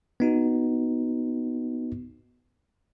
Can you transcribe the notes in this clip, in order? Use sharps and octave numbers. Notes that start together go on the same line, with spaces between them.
B3 D#4 F#4